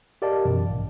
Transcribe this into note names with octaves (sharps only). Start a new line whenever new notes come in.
G4 A#4 D5 D#5 F5 A5
F#2 B2 E3
A#1 G#2